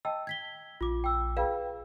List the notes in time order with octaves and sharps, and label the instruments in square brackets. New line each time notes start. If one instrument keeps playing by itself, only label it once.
[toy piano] D#5 G5 A5 [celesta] E6
[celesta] G#6 B6 G7
[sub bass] A#1 [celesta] F4 D6
[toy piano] G5 E6
[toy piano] F4 G#4 D5 [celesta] B4 F5 G5